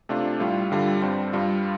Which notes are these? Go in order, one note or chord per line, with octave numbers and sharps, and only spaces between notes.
C3 A3 D4 F4
A2 G3 F4
G2 D3 G3 F4
G2 G3 C4
G2 G3 F4